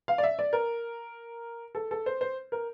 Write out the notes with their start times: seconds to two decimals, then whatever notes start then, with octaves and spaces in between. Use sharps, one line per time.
0.08 F5
0.18 D5
0.23 E5
0.39 D5
0.53 A#4
1.75 A4
1.91 A4
2.06 C5
2.21 C5
2.52 A#4